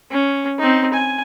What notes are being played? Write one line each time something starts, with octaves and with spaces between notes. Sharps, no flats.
C#4
C4 D#4
G#5